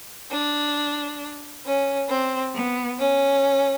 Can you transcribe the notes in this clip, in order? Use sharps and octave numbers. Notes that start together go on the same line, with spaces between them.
D4
C#4
C4
B3
C#4